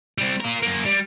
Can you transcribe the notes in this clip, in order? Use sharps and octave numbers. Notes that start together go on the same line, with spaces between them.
G3 C4
F4 A#4
F#2 A#3
G3